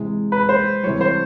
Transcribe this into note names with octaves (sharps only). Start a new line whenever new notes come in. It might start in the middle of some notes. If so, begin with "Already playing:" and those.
Already playing: C3 E3 G#3
B4
C5
C3 E3 G3 C#5
C5